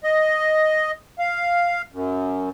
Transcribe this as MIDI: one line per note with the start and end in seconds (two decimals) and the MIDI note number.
0.04 0.91 75
1.19 1.82 77
1.92 2.49 42